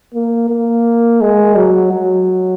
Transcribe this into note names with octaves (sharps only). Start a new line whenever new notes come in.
A#3
A#3
G#3
F#3
F#3